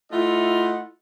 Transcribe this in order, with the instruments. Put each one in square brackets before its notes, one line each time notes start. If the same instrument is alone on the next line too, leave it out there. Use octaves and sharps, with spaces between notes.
[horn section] A3 E4 F4 D#5 F#5